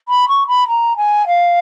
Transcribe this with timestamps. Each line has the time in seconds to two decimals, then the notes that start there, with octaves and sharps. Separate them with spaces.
0.09 B5
0.28 C#6
0.48 B5
0.68 A#5
0.97 G#5
1.27 F5